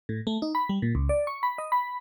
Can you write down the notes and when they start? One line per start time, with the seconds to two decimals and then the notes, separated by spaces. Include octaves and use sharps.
0.09 A2
0.27 A3
0.42 D#4
0.55 B5
0.69 G3
0.82 A#2
0.95 C#2
1.09 D5
1.27 C#6
1.43 B5
1.58 D#5
1.72 B5